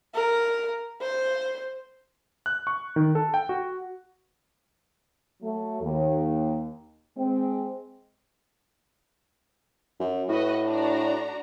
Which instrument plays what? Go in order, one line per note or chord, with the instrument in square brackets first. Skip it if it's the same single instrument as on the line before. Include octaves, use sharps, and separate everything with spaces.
[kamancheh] A#4
C5
[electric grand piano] F#6
C#6
D#3
A4
G5
F#4
[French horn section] F#3 A3
D#2
G#3 C4
[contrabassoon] F#2
[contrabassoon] A2 [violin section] F#4 B4 D#5
[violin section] D4 F#4 A#5